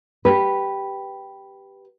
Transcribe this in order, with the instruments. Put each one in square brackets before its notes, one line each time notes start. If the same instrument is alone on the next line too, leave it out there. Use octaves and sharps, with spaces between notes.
[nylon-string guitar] G4 B4